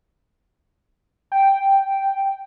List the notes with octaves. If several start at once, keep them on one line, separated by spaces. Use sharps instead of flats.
G5